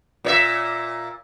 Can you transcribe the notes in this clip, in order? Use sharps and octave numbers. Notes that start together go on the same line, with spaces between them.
A#2 C#5 E5